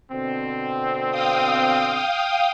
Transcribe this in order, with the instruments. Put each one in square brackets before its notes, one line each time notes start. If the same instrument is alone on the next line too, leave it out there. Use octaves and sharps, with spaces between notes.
[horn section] B2 D3 C4
[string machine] F5 G5 D#6